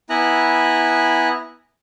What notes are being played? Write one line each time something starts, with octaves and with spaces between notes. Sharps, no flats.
B3 E4 G#5 A#5 F#6